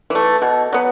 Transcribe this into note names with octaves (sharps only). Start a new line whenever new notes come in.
E3 A3
B2
F#3 B3